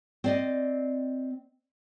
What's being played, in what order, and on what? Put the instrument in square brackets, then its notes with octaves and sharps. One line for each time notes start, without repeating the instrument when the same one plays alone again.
[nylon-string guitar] C4 D5 D#5